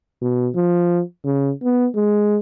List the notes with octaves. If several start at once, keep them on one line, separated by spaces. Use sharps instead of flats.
B2
F3
C#3
B3
G#3